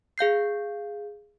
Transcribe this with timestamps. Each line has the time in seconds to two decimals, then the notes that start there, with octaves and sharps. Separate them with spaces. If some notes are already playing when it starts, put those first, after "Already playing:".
0.18 G#4 F5 G6 C7